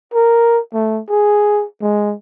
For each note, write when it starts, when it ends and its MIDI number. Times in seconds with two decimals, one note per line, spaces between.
0.14 0.60 70
0.74 1.01 57
1.09 1.65 68
1.81 2.15 56